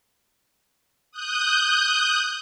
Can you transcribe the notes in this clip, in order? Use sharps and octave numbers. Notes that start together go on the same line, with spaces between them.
D#6 F#6 G6